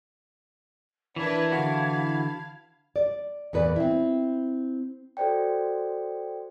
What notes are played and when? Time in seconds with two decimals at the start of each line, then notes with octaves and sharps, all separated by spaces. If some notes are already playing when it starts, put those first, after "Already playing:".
1.16 E3 D4 E4 A#4 B4 A5 B5 G#6
1.52 D3 F#4 F5
2.96 D5
3.53 E2 A#2 B4 D5
3.76 C4 E4
5.17 F#4 A4 C5 D5 G5